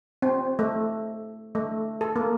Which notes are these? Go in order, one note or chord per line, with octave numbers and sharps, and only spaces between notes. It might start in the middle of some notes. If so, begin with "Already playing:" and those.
C4
A3
A3
A4
A#3